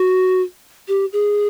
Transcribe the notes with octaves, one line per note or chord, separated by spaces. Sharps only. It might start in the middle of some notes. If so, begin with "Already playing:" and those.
Already playing: F#4
G4
G#4